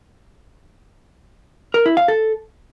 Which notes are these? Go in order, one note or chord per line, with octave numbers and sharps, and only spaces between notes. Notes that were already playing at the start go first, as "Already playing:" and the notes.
A#4
E4
F5
A4